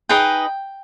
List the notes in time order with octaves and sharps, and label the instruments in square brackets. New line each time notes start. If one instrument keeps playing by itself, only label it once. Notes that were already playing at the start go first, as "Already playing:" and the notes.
[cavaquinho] D#4 G#4 B4 D#5 G5